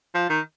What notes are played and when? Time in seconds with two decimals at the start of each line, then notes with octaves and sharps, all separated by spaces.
0.15 F3
0.30 D#3